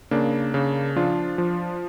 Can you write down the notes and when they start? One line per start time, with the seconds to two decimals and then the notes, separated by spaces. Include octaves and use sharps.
0.11 C#3 A#3 D4
0.54 C#3
0.96 F3 D4 F4
1.38 F3